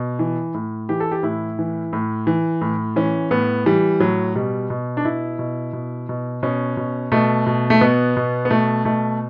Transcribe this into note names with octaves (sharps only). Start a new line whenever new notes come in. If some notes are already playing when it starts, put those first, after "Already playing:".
Already playing: B2
E3
A2
E3 G4
A4
G4
A2 E4
E3
A2
E3
A2
E3 C#4
A2 B3
E3 G3
A2 F#3
B2 G3
B2
D4
B2 E4
B2
B2
B2
B2 C#4
B2
B2 A3
B2
A3
B2 B3
B2
B3
B2 A3
B2 A3